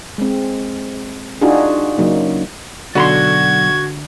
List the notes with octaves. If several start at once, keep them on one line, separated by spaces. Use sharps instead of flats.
G#3 C4
D4 D#4 F4 F#4 G#4
C#3 F#3 A#3 D#4
B1 D3 F#4 B5 C6 G#6